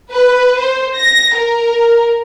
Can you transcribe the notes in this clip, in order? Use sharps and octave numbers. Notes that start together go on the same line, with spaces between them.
B4
C5
A#6
A#4